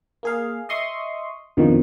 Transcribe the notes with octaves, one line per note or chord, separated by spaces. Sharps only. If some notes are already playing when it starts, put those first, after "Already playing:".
A#3 G#4 F5
D#5 E5 C6 C#6 D#6
F2 B2 D3 D#3 F3